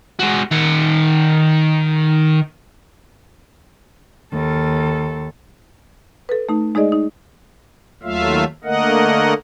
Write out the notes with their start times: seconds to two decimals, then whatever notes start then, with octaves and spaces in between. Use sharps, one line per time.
0.20 G#3 F#4
0.52 D#3 F#5
4.32 D#2 A4
6.29 A4 B4
6.49 A3 D#4
6.75 G#3 D#4 G#4 D5 D#5
6.92 D#4
8.03 D#2 F#3 A3 F4 E5 F5
8.64 D3 A3 A#3 A#4 D#5 F#5